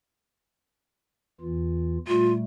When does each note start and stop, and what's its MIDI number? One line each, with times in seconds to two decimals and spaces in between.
1.41 1.98 40
1.41 1.98 52
1.41 1.98 65
2.07 2.44 46
2.07 2.44 55
2.07 2.44 57
2.07 2.33 65